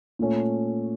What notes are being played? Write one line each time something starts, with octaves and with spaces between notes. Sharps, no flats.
A#2 A3 C#4